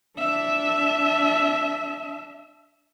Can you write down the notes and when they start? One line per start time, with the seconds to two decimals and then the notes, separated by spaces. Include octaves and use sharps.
0.18 D4 E5